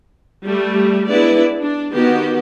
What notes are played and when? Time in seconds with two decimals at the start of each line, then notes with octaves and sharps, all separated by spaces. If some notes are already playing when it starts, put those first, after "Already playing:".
0.43 G3 A3 G4
1.07 G#3 B3 D4 E4 B4 D5
1.60 D4
1.93 D#3 B3 F#4 G4